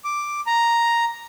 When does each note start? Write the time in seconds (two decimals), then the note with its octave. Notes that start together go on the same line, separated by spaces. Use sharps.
0.04 D6
0.46 A#5